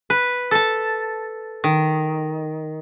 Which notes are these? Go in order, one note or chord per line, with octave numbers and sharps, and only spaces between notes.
B4
A4 A5
D#3